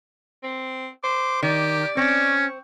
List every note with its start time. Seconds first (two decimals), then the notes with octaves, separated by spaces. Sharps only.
0.43 C4
1.04 C5 D6
1.43 D#3 G4 D5
1.97 C4 C#4 C#6